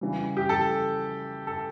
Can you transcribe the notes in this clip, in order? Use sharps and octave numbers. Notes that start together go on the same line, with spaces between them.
C#3 E3 G3
G4
A4
A4